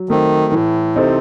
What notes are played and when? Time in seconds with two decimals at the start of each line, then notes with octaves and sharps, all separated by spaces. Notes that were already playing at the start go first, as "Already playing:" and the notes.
Already playing: F#3
0.09 D#3 A3 C4
0.52 A2 E3
0.96 C3 C4 D#4 A4 C5